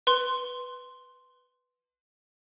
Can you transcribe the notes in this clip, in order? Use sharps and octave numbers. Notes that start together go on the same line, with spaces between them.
B4 C6